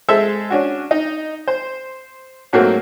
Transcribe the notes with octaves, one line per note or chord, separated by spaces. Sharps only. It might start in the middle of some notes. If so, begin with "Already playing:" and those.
G#3 A4 C5 E5
C#4 D4 F#4
D#4
C5
G#2 F#3 A3 A#3 C4 F#4